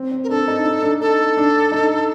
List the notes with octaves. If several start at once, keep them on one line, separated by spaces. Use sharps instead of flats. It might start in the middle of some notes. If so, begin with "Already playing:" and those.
Already playing: C4
C4
A#4
D4 A4
D#4
D#4
D4
D#4 A4
D4
D#4